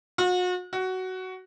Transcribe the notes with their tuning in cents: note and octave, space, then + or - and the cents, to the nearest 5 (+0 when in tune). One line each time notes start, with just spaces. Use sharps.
F#4 -40
F#4 +10